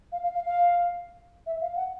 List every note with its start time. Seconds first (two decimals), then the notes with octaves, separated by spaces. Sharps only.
0.12 F5
0.23 F5
0.35 F5
0.46 F5
1.46 E5
1.61 F5
1.76 F#5